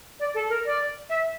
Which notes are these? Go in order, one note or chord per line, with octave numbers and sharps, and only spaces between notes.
D5
A4
A#4
D5
E5